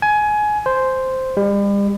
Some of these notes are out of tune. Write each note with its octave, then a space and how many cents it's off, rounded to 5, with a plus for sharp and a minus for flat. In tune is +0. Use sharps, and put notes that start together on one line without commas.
G#5 +20
C5 -5
G3 +40